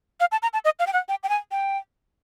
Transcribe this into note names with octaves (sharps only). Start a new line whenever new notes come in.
F5
A5
A#5
A5
D#5
F5
G5
F#5
G5
G5
G#5
G5